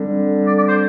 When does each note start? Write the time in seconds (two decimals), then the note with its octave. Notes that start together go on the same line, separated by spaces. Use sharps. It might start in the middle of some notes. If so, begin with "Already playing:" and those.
Already playing: D3 G3 C4
0.47 D5
0.58 D5
0.69 C5